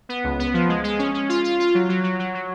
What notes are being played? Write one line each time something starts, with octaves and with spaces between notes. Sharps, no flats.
B3
C#2
B3
F3
G#3
G#3
C#4
C#4
F4
F4
F4
F#3
F#3
F#3
F#3
F#3